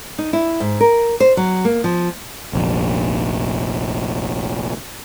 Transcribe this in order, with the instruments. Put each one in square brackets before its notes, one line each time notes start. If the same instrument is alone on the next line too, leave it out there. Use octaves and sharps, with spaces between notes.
[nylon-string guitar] D#4
E4
G#2
A#4
C5
F#3
A#3
F3
[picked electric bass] F1 A#1